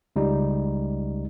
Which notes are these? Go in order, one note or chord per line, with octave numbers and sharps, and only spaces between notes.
C#2 G3 D#4